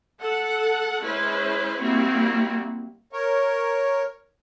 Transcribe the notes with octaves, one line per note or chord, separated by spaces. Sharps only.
A4 F#5
G#3 C#4 E4 B4 C5
G3 A#3 C4 E4 F#4
A#4 C#5